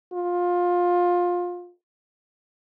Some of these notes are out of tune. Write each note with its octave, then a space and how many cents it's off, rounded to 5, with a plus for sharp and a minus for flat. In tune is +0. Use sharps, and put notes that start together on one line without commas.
F4 +20